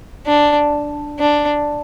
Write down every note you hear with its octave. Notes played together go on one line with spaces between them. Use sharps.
D4
D4